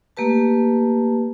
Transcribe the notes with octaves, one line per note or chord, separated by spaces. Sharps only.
A3 A#3 G4 B4 A5